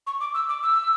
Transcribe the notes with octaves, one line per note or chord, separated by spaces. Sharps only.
C#6
D6
E6
D6
E6